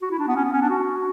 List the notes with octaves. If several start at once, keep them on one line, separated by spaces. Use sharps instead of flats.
F#4
E4
D4
B3
C#4
B3
C#4
D4
F#4